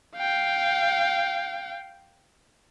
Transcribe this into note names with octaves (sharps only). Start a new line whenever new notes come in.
F5 G5